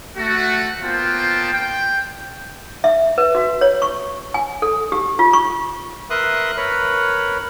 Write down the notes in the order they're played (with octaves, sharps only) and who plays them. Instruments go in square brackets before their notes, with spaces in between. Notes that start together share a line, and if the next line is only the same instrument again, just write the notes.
[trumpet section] A3 F#4
A#3 B3 F4 C5 G5 A5
G5
[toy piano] E5
B4
F#4
C#5
C#6
G#5
A4
G4
F4
C#6
[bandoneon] A#4 B4 E5 C6 D#6 F#6
A#4 B4 C#5 B5